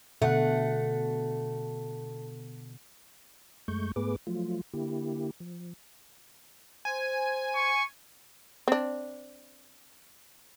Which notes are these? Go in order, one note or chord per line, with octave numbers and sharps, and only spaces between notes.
B2 D3 A3 F#5
F#2 G#3 A3 C#6 G6
G#2 A3 B3 G#4 B4 D6
F3 F#3 A3 F4
D3 A#3 E4 G4
F3
C5 G#5
C#6
C4 D4